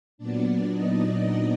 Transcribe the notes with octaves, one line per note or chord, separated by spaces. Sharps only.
A#2 F#3 B3 D4 D5
D#4 D#5